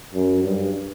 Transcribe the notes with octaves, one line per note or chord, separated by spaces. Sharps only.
F#2
G2